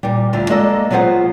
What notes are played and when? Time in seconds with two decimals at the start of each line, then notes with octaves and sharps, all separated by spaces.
0.03 A#2 G3
0.33 D2 D3 F4
0.50 G#3 A#3 A4 D5 D#5
0.91 F#3 B3 F4 G#4 C5 F#5